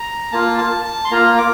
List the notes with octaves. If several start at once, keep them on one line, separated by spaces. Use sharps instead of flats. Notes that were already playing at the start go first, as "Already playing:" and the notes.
Already playing: A#5
A#3 F4 A5
A5
A5
C6
A#3 F4 A#5
D6